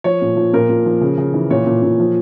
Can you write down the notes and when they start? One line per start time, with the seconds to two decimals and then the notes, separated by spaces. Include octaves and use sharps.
0.04 F3 C#5
0.21 A#2
0.37 F3
0.53 A#2 A#4
0.69 A#2
0.86 F3
1.01 C#3
1.18 C#3
1.34 E3
1.50 A#2 C#5
1.67 A#2
1.83 A#2
2.00 F3